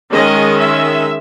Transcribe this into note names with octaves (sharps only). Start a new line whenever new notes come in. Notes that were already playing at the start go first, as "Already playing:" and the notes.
D#3 G#3 C#4 D#5
E5